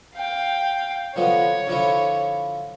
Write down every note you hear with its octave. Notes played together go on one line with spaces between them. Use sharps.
F5 G5
D3 F3 B3 C#5
D3 F3 E4